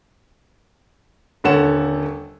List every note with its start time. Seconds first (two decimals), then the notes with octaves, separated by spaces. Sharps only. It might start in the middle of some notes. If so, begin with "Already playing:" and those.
1.44 D#1 D3 A4 C#5 F#5 E7